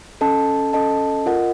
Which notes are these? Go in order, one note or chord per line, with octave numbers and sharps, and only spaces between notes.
C#4 A4 D#5 A5
C#4 A4 D#5 A5
F4 A#4 D#5 F#5